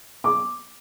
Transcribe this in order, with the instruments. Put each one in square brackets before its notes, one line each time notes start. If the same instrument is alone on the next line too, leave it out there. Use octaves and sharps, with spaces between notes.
[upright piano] D6